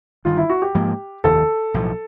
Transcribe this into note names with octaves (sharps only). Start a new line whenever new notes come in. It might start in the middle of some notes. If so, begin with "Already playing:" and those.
G1 G2 D#3 F4
E4
F#4
G4
G#2 F3 A#3
F1 D#2 D#3 A4
B1 A2 F3